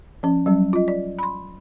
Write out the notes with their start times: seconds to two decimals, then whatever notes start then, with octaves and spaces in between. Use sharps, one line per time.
0.23 F3 C#4
0.46 F#3 G3 C#4
0.73 F4 D#5
0.88 D5
1.19 B5 C6